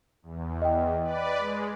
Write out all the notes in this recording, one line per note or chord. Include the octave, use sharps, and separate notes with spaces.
E2
D#5 G5
B4 D5
G#3